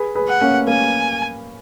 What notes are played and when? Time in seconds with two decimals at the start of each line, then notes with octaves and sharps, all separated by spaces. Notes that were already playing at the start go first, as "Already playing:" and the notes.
Already playing: G#4 B4
0.15 G#4 B4
0.28 F#5
0.41 A#3 C#4
0.67 A#3 C#4 G#5